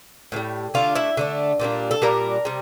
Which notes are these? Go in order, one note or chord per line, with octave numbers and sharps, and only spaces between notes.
A2 E3 G3
D3 A3 D4 F4 F5
E4 E5
D3 A3 D4
A#2 G3 A#3 D4
A4
A#2 G3 A#3 D4 A#4
C3 G3